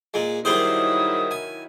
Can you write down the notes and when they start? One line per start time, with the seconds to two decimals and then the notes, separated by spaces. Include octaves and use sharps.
0.14 A#2 G#3
0.45 D#3 F#3 G3 E4 G#4 C5 D#6
1.31 G#5